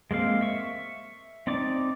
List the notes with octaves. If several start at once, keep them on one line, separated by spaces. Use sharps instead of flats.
G#3 A#3 C4 F5
E5 C#6
C4 D#4 D5 D6